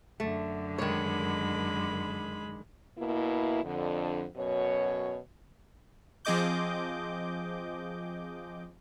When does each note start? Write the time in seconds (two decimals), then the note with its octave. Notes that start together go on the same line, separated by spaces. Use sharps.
0.20 F#2 D3 A3
0.79 D#3 G#3 C#5 B5
2.99 B2 A#3 E4
3.64 F2 D3
4.37 F#2 B2 C#5
6.25 F3 C4 G#4 D#5 D6 G6